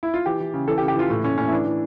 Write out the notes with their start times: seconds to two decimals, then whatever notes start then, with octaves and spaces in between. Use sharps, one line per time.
0.03 E4
0.14 F4
0.26 E3 G4
0.40 E3
0.54 C#3
0.68 E3 A4
0.78 G4
0.81 C#3
0.88 G4
0.95 E3 F4
1.10 A2
1.24 A2 C#4
1.38 A2 C#4
1.48 E4
1.52 E3 D4
1.65 E3